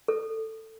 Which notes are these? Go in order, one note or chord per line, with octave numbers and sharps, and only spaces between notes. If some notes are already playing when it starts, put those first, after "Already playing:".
A4